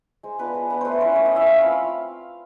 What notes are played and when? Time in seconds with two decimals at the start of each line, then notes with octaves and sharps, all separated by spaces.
0.23 G#3 C5
0.39 B3 D4 F4 B4
0.55 G#3
0.70 B3 D4 F4 B4
0.81 A3 B4 C5
1.01 C#4 E4 C5
1.15 A3 C#5
1.26 D#5
1.31 C#4 E4 E5
1.46 A3 F5
1.61 C4 F4 B5